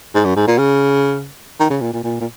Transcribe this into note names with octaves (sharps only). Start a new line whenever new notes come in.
G#2
F#2
G#2
A#2
C#3
D#3
C#3
A#2
A#2
A#2
A#2